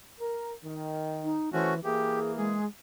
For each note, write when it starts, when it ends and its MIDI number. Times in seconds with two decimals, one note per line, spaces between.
0.20 0.52 70
0.64 1.35 51
1.24 1.50 63
1.53 1.80 52
1.53 1.74 57
1.53 1.74 61
1.53 1.74 66
1.53 1.74 72
1.84 2.60 52
1.84 2.60 58
1.84 2.19 67
1.84 2.32 68
2.37 2.66 56
2.37 2.64 68